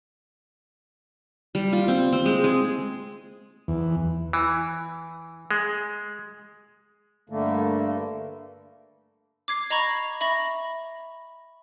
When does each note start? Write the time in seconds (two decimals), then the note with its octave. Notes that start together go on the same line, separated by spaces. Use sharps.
1.55 G3
1.73 F4
1.88 C4
2.13 C4
2.26 G#3
2.44 G#4
3.68 E2
4.33 E3
5.51 G#3
7.30 G2 D3 A3 A#3
9.48 D6 G#6 C7
9.70 D#5 A#5 B5 C#6 G#6 A#6
10.21 E5 B5 C#6 A#6